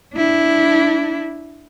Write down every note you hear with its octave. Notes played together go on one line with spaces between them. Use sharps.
D4 E4